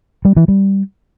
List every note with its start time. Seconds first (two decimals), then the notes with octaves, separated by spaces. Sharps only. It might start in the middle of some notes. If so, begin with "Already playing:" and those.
0.25 G3
0.37 E3
0.48 G3